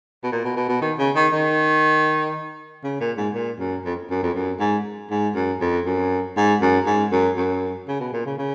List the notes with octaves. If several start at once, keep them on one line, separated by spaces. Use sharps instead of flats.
B2
A#2
B2
B2
B2
D#3
C#3
D#3
D#3
C#3
A#2
G#2
A#2
F#2
F2
F#2
F2
F#2
G#2
G#2
F#2
F2
F#2
G#2
F#2
G#2
F#2
F#2
C#3
B2
A#2
C#3
C#3